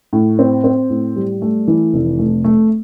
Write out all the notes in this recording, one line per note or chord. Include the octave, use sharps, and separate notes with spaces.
A2
C4
C4
A2
G3
A3
E3
F1
A3
A3